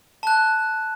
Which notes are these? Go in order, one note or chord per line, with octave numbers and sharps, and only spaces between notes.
A5 F#6